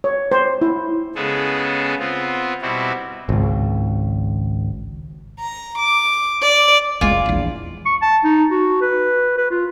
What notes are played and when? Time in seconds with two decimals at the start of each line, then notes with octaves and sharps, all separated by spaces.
0.04 C#5
0.32 C5
0.61 E4
1.15 C#3 G#3 B3 G#4 A4
1.99 B3 C4 F4
2.62 B2 G3 C4 E4 F#4
3.29 G#1 C#2
5.39 A#5
5.78 D6
6.42 D5
7.01 F1 C2 G#3 F4 D5 G#5
7.26 A#1 E2
7.86 C#6
8.02 A5
8.24 D#4
8.51 F#4
8.81 B4
9.38 B4
9.51 F4